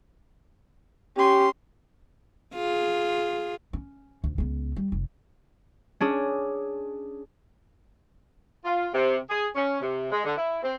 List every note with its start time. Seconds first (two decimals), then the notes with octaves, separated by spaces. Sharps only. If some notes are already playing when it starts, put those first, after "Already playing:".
1.17 C#4 G4 C6
2.55 F4 G#4
3.73 C#4
4.24 D2
4.38 C#2 B3
4.76 G3
4.92 F1
6.00 C#4 D4 G#4
8.65 F4
8.93 C3
9.29 G#4
9.55 C#4
9.80 C3
10.11 G#3
10.24 D3
10.37 E4
10.63 C4